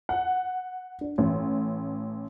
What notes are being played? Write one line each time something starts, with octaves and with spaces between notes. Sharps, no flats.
F#5
D4
A1